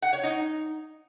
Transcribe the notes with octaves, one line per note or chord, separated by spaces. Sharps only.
F#5
C#5
D#4